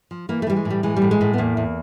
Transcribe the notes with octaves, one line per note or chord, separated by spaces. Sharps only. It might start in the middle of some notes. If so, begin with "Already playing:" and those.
F3
E3 A#3
A3
E3 G3
G#3
A2
G3
E3 G#3
G3
A2
G#3
A2
B3
E2 A#3
E2